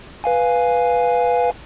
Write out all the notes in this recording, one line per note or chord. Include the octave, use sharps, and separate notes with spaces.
B4 F5 G#5